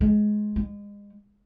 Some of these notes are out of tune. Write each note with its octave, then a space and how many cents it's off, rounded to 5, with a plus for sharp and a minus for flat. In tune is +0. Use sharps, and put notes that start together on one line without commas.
G#3 +15
G#3 -30